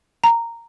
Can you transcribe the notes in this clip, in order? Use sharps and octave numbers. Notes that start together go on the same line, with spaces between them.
A#5